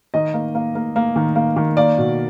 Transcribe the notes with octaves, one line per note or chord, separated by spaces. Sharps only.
D#3 D#5
A#3
A#3
A#3
A#3
D#3
A#3
D#3
A#3 D5
B2